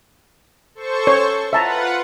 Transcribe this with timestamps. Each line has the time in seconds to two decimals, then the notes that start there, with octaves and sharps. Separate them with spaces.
0.75 A4 C5 C#6
1.07 C#5
1.53 F4 B4 E5 F#5 A5 A#5